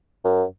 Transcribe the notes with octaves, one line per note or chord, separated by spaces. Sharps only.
F#2